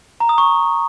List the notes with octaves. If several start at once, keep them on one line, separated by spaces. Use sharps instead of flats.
A#5
D#6
C#6